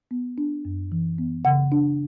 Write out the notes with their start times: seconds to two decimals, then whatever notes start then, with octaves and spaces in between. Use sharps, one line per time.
0.11 B3
0.38 D4
0.65 F#2
0.92 E3
1.18 B3
1.45 C#3 F#5
1.72 D4